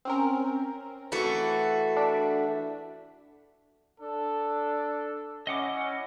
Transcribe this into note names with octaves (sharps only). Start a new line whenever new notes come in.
C4 C#4 A#4
E3 A3 F#4
D4 B6
D4 A4
C#4 E4 D#5 F#5 D6